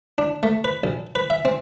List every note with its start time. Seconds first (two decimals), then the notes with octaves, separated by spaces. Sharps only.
0.18 D4
0.43 A3
0.64 B4
0.84 A#1
1.15 B4
1.30 E5
1.45 C4